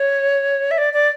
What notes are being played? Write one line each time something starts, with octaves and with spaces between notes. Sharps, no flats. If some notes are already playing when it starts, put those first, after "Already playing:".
Already playing: C#5
E5
D5
D5